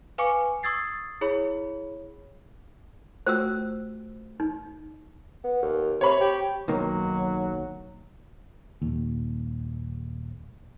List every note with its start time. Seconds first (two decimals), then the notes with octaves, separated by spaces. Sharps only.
0.18 B4 F5 G#5 C#6 D6 C#7
0.63 C#6 D#6 E6 G#6 A6 C7
1.21 E4 G#4 C#5 B5
3.27 A3 F4 F#4 C5 E6
4.40 D#4
5.44 B3
5.63 D#2
6.01 C3 C#5 B5
6.21 G4
6.68 B1 D#3 F#3 A#3
8.82 D#1 D#2